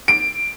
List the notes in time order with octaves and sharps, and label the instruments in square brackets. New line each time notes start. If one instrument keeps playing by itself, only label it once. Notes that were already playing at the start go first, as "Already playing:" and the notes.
[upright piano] D7